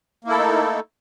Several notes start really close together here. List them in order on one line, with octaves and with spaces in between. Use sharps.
A#3 E4 A4 A3 D#4